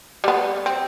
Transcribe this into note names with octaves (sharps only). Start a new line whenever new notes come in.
G3 B3
C4